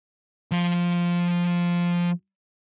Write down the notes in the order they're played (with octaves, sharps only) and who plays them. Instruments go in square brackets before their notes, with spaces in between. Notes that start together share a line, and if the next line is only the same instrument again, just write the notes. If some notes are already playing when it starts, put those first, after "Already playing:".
[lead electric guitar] F3 F5